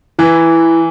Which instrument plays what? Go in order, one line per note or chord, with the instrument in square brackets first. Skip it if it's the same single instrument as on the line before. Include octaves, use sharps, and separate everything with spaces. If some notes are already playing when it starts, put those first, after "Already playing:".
[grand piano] E3 [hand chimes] E4